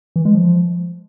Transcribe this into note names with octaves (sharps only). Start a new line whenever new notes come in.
E3
G#3
F3